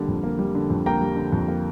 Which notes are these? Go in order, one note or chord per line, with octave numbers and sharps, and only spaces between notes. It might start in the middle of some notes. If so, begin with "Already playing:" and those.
Already playing: D3 G3 A#3
F2
A#3
G3
D3
F2
A#3 G5 A#5
G3
D3
F2
A#3